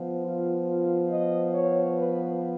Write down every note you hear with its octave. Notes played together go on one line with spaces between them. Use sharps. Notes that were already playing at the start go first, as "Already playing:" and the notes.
Already playing: F3 B3
F4
F4
D#5
C#5
B4